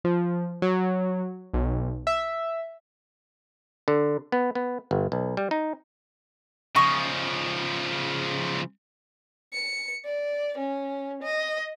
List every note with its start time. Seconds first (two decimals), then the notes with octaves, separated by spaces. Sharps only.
0.04 F3
0.62 F#3
1.54 B1
2.07 E5
3.88 D3
4.32 B3
4.55 B3
4.91 G1
5.12 B1
5.37 G3
5.51 D#4
6.76 C#3 F3 D#5 C#6 D#6
9.53 C#7
10.05 D5
10.58 C#4
11.23 D#5